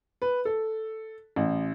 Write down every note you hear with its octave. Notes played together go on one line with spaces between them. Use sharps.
B4
A4
A1